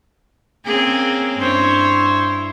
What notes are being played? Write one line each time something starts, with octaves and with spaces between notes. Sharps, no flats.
A#3 C4 C#4 G#4
G2 E4 C5 C#5